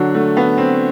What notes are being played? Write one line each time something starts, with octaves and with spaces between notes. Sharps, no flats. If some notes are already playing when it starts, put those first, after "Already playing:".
Already playing: D3 F#3
A3
B3
C4